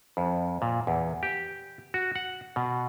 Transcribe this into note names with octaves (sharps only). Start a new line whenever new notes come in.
F2
A#2
E2
G4
F#4
F#5
B2